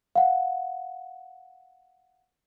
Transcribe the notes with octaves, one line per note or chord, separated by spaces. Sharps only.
F5 F#5